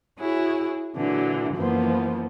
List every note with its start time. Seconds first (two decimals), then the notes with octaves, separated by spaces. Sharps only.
0.19 E4 F#4 G#4 C#5
0.96 A#2 D3 E3 F#3
1.55 F#2 E3 F3 A#3 B3